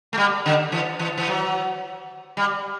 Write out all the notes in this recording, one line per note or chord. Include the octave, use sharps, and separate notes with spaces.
A3
G3
D3
E3
E3
E3
F#3
G3